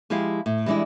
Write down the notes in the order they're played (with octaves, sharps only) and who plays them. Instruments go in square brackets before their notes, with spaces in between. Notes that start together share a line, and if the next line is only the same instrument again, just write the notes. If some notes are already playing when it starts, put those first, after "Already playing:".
[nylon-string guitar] F3 G#3 E4 G4 F5
A2
E3 G3 G#3 D4 E4